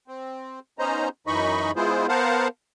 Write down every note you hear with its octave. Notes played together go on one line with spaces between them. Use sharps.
C4
B3 C#4 D#4 C5 D#5 A#5
F#2 E3 D#4 D#5 B5 C#6
G#3 B3 E4 F4 G#4 C5
B3 A#4 C5 F5 F#5 A5